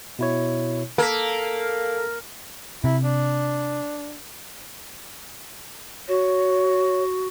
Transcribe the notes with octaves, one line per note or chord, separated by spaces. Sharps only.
B2 E4 C#5
A#3 A4 B6
C3 E4
D4
F#4 C#5